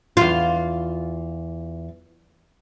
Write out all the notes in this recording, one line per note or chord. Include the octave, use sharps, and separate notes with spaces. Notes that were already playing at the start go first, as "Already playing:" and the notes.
E2 F4